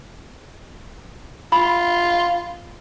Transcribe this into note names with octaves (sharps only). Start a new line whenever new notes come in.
F4 B5